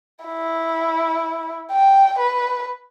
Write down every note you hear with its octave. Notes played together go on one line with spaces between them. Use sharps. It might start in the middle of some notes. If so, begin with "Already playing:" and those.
E4
G5
B4